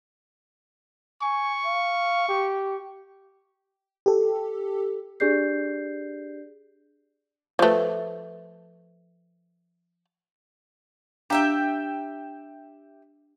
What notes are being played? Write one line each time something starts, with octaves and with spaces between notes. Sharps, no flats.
G#5 C#6
F5
G4
G4 A4
D4 G4 G#4 D5 G6 C7
F3 A3 B4 C5
D4 G4 E5 F5 G5 A#5